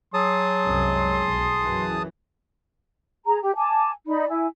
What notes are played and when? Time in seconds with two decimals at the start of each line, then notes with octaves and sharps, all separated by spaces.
0.14 F#3 G#4 A5 C6 D#6
0.66 C2 F#2 G#3
1.20 B1
1.62 F#2 E3
3.25 G#4 A#5
3.42 G4
3.56 G#5 A5 D6
4.08 D#4 D5 B5
4.29 E4 G#5